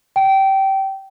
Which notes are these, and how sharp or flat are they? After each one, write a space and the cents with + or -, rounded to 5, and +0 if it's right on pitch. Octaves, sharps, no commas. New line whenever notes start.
G5 -20